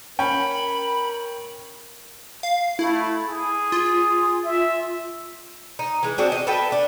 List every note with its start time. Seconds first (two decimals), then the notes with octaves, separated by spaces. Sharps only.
0.19 C#4 A#4 G5 B5
2.43 F5
2.79 A3 E4
3.28 G#4
3.72 F4
4.44 E5
5.79 D#4
6.03 E3 G#3
6.18 C4 D4 F#4 G#4
6.32 D#5
6.47 A4 B4 E5 G5
6.72 D4